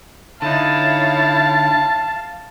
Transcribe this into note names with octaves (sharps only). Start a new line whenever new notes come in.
D3 D#4 E4 C#5 F5 A5 A6